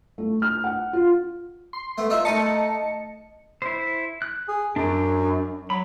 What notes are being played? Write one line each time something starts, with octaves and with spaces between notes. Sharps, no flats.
A3
F6
F#5
F4
C6
A3 B3
D#4 F4 E5
A3 D#4 A#4 D#5 A5 C#7
E4 C5
F#6
G#4
F#2 F#3 D4
F#3 B5